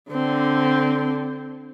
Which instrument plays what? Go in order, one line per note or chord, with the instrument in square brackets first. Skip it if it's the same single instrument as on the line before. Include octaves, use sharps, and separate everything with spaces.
[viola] D3 C4